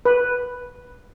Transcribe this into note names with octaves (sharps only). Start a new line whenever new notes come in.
B4